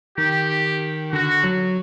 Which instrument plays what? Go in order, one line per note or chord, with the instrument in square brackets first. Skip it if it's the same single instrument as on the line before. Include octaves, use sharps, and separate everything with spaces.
[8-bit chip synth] D#3 [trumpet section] G4
[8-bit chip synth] D3 [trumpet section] F#4
[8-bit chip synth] F#3